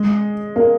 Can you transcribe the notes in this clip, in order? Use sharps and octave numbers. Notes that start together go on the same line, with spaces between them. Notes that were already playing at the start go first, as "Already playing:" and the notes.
Already playing: G#3
A#3